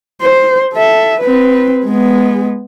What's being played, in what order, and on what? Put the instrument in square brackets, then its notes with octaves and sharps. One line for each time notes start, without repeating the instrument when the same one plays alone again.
[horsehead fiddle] C5
A4 E5
C4 B4
G#3 B3